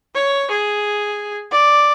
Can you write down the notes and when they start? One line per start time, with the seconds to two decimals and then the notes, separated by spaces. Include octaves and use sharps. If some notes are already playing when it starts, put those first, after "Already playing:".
0.14 C#5
0.50 G#4
1.51 D5